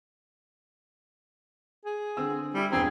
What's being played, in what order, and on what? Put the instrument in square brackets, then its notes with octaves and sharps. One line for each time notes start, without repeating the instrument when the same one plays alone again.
[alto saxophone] G#4
[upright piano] D3 C4 E6
[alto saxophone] G3 [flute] E4
[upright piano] E1 G2 A#5 [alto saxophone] C4 [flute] G#4